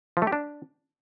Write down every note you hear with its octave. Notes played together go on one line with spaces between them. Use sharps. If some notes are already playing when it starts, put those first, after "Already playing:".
F3
A3
G4
D4